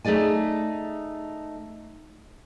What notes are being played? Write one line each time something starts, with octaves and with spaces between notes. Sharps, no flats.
A3 D#4 G#4 D5 G#5